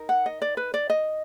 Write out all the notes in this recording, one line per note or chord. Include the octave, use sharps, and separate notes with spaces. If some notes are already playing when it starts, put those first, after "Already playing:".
Already playing: D#4 A#4
F#5
D#5
D5
B4
D5
D#5